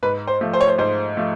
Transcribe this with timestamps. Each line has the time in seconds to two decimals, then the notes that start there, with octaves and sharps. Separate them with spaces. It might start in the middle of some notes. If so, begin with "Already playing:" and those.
0.03 G#2 B4
0.27 C5
0.41 F3 A3
0.53 C5
0.61 C#5
0.68 C5
0.78 G#2 C5
1.17 F3 A3